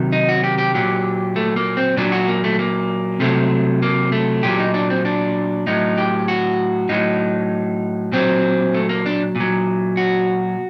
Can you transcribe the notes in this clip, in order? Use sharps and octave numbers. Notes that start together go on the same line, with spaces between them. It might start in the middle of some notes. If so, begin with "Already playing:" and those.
Already playing: C3 D#3 F#3
D#4
F#4
G4
G4
A#2 F#3 G4
A3
A#3
C4
A#2 F#3 D4
F#4
A#3
A3
A#3
C3 D#3 F#3 A3
A#3
A3
A#2 F#3 G4
D#4
D4
C4
D4
A2 F#3 D#4
G4
F#4
A2 F#3 D#4
A#2 F#3 C4
A3
A#3
D4
A#2
F#3
F#4